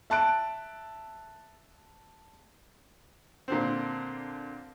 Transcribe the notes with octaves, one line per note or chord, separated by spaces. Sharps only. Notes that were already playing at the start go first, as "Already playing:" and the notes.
E5 A5 F#6 D7
A#2 D3 C4